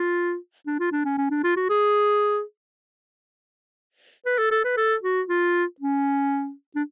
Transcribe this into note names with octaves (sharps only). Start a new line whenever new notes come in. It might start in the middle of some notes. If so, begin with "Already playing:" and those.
Already playing: F4
D4
F4
D4
C#4
C#4
D4
F4
F#4
G#4
B4
A4
A4
B4
A4
F#4
F4
C#4
D4